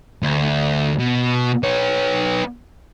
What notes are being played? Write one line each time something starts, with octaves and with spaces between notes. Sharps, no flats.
D2
B2
B3 C#5